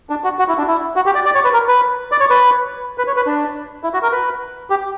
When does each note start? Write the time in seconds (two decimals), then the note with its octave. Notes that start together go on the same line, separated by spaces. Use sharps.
0.10 D4
0.24 F#4
0.39 F#4
0.48 E4
0.58 D4
0.68 E4
0.96 F#4
1.06 G4
1.15 D5
1.25 D5
1.35 C#5
1.44 B4
1.53 A#4
1.68 B4
2.12 D5
2.20 C#5
2.30 B4
2.98 B4
3.07 C#5
3.16 B4
3.26 D4
3.84 E4
3.94 F#4
4.03 A#4
4.12 B4
4.70 G4